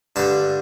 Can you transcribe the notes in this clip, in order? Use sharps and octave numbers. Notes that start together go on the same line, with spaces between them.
G2 D3 G3 A5